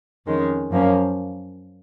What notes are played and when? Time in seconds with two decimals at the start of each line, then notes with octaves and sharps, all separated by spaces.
0.27 F2 D#3 G#3 C#4
0.70 F#2 F3 A#3 C#4